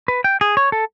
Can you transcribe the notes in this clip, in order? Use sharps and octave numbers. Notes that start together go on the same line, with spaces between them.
B4
G5
G#4
C#5
A4